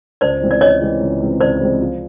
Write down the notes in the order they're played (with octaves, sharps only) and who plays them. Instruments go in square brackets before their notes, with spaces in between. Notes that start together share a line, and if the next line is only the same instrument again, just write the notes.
[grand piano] C#2 [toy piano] C5 D5
[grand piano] C3 E3 G#3 C4
[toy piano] D5
[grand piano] C#2 [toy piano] C#5 D#5
[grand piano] C3 E3 G#3 C4
C#2
C3 E3 G#3 C4
[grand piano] C#2 [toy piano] C5 D5
[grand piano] C3 E3 G#3 C4
F3